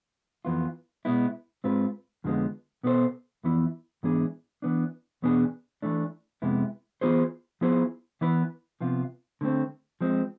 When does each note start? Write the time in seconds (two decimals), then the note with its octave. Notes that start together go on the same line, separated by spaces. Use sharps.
0.45 F2 E3 B3 F4
1.05 B2 G#3 B3 E4
1.64 G#2 G#3 C4 F4 B4
2.24 F2 D3 F3 G#3 B3
2.83 B2 B3 F4 A4 C5
3.44 F2 E3 B3 E4
4.03 G#2 E3 B3 D4 G#4
4.62 E3 B3 D4
5.22 E2 B2 B3 D4 G#4
5.82 E3 A3 D4
6.42 F2 C3 G#3 B3 E4
7.01 E3 B3 F4 G#4 C5
7.61 F3 B3 E4 G#4 C5
8.21 E3 B3 E4 B4
8.81 C3 F3 B3 F4
9.41 D3 A3 C4
10.01 F3 G#3 C4